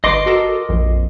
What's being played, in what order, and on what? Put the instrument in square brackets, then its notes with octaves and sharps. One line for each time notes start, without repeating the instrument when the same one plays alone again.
[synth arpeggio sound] G1 B4 C7 [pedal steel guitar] D#5 C6 D6
[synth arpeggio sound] F#4 A4 A#4
A#1 F2